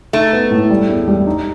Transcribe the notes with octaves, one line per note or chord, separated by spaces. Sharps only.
A3 D#4
B3
A2
G3
E2
G3
D#4